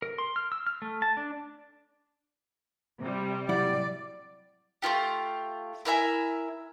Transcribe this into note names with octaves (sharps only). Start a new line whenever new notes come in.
A#4
C6
F6
E6
F6
A3
A5
D4
C3 G3
F#3 E4 D5 F#5
A3 B3 F4 G4
E4 A#4 E5 G#5